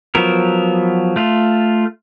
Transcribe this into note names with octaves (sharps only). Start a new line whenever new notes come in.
F3 F#3 B3 A#4
A3 F4